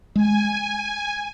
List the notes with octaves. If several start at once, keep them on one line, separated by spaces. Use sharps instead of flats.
G#3 G#5